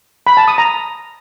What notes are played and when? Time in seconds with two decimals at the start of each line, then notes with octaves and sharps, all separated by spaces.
0.27 B5
0.37 A5
0.48 D#6
0.58 A#5